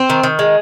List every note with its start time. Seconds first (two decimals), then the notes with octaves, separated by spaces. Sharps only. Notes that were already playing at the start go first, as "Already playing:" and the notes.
Already playing: C4
0.10 D#3
0.23 D#3
0.39 G#3